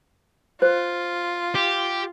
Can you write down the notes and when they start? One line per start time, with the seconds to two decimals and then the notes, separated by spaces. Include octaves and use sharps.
0.62 F4 C5
1.55 G4